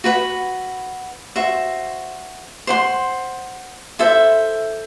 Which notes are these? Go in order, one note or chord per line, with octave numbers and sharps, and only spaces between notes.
F#4 B4 F#5 B5
F#4 C5 E5
C5 F#5 C6
E4 A4 C5 E5